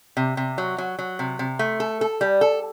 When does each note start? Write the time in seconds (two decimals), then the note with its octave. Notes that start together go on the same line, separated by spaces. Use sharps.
0.17 C3
0.37 C3
0.58 F#3
0.78 F#3
0.99 F#3
1.19 C3
1.39 C3
1.59 A3
1.80 A4
2.01 A4
2.21 G3
2.41 A4